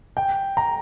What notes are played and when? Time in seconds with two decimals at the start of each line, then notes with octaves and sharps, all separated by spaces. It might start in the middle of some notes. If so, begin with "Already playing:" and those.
0.17 G5
0.57 A#5